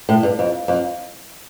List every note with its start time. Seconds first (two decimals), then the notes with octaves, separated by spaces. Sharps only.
0.09 A2
0.23 G2
0.39 F2
0.68 F2